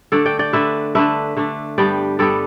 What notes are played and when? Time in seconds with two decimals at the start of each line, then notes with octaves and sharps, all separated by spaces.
0.12 D3 A3 D4 A4 D5
0.25 D5 G5
0.39 D5 G5
0.53 D3 A3 D4 B4 E5
0.95 D3 A3 D4 B4 E5
1.37 D3 A3 D4
1.78 G2 G3 B3 D4 D5 G5
2.19 G2 G3 B3 D4 A4 D5